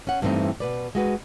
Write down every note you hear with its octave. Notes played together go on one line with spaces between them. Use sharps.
C#4 F#5
G2 E3 A3 A#3 C4 D#4
B2 B4 D5
G#3 F#4 B4